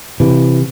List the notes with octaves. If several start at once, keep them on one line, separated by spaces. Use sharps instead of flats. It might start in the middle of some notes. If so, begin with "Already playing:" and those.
C3 E3